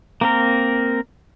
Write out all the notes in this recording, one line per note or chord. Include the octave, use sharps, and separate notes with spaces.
A#3 C4 A#4